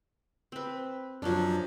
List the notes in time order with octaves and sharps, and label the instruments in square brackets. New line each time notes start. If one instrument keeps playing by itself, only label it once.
[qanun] C4 B4
[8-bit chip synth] F#2 F#3 [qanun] F3 C#4 D4